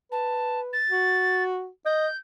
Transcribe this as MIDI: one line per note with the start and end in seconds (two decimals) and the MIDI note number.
0.12 0.78 71
0.12 0.60 81
0.73 1.43 93
0.90 1.68 66
1.85 2.07 75
1.85 2.16 91